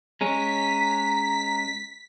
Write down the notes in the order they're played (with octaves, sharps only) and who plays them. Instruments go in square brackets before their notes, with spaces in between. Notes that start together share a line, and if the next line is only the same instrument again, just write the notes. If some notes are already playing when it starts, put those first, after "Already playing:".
[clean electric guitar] G#3 C#4 [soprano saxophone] A#5 [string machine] B6